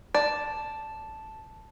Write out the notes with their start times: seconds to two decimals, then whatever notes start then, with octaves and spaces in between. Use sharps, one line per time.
0.14 D5 A5